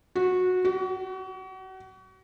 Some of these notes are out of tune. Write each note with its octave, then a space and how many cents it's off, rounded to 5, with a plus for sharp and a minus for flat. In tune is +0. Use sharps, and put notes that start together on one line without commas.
F#4 -15
F#4 +35